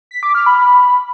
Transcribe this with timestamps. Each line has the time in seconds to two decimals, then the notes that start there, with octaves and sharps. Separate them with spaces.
0.11 B6
0.23 D6
0.35 F6
0.46 B5